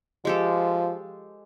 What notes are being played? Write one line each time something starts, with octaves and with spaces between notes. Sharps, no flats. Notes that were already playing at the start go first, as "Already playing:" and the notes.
F3 G#3 G4 A4